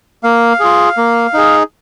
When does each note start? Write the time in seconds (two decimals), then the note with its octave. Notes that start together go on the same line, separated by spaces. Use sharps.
0.23 A#3 F5
0.60 F4 G#4
0.97 A#3
1.34 D#4 G#4